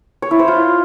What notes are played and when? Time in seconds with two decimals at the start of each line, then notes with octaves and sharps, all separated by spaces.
0.22 C#5
0.31 E4
0.39 C5
0.48 F4